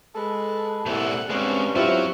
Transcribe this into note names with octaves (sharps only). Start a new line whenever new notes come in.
G#3 A4 B4
C2 A#2 E4 A4 F#5
G2 G#3 C4 C#4
F#3 C4 E4 F4 G4 C#5